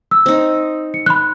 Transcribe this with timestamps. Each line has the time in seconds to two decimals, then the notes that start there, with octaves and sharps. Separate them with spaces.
0.11 E6
0.26 C4 D#4
0.94 C#7
1.06 B5 C6 F#6